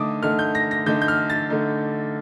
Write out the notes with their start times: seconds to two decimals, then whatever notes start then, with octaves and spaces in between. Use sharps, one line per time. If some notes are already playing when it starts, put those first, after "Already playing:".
Already playing: D3 A3 D#4 D6 D#6
0.23 D3 A3 D#4 F6
0.39 G6
0.55 A#6
0.71 A#6
0.86 D3 A3 D#4 G6
1.02 G6
1.08 F6
1.30 A6
1.50 D3 A3 D#4